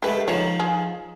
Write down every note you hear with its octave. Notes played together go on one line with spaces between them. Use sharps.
G#3 A3 G4 B4
D#3 F3 C#5
F4 G#4